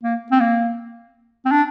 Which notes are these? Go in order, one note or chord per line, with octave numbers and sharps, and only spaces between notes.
A#3
C4
A#3
C4
D4